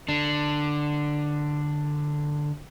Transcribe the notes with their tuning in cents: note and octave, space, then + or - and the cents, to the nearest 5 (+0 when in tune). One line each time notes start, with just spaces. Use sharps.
D3 +10 D4 +10